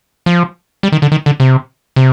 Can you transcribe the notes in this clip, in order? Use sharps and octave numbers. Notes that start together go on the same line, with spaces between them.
F3
G3
D#3
D3
D#3
D3
C3
C3